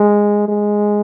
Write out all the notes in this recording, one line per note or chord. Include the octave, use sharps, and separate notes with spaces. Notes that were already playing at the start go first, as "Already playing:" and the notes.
Already playing: G#3
G#3